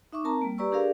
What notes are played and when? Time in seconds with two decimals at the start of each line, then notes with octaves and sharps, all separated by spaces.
0.13 D#4 E5 C#6 D6
0.24 C4 A#4 A5 A#5
0.42 G3 A#3
0.58 G4 B4 D5 A#5 C#6 E6
0.72 D4 G4 G#4 A#4 D5 F5